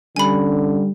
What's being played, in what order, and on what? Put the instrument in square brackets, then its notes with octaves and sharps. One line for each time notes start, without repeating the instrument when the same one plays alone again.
[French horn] D3 [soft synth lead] G3 [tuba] C#4 [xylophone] G#5 B5